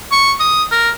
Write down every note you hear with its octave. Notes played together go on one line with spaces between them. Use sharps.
C#6
D#6
A#4